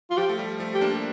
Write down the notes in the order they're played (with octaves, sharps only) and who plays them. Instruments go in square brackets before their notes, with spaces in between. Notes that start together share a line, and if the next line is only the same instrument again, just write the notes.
[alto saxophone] F4
[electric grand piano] F3 [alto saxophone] G4
[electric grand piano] A3
G3
F3 A3
[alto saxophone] G4
[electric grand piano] A#3 D4